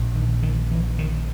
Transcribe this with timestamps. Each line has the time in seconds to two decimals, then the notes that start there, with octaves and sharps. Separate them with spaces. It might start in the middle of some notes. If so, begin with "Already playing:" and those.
Already playing: A#1 A#2
0.15 D#3
0.42 D#3
0.71 E3
0.99 D#3